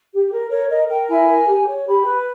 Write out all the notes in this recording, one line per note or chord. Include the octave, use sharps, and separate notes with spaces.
G4
A#4
A#4 C#5
A#4 D#5
A#4 G5
E4 G#5
A#4
G4
C#5
G4 B5
B4